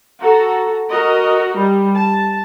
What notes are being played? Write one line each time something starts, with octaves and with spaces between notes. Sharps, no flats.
F#4 A4 A#5
F#4 A#4 D#5
G3
A5